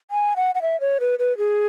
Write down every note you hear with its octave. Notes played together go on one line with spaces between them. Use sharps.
G#5
F#5
F#5
E5
C#5
B4
B4
G#4